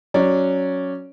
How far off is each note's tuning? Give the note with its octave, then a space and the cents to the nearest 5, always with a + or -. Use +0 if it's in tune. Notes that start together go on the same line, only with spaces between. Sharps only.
F#3 +0 C#4 +0 D5 +0